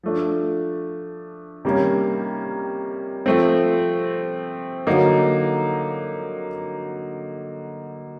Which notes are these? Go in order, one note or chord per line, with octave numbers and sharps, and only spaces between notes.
F3 A3 D4
C3 D#3 G3 A#3 C#4
F3 A3 C4
D3 F#3 A#3 D#4